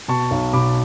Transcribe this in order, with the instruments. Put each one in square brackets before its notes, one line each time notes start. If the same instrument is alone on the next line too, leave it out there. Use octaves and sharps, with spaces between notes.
[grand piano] B2 A5 C#6
B1
B2 B5 D6